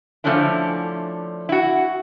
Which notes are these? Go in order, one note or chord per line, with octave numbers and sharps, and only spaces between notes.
D3 F3 A3 C#4 D4 E4
E4 F#4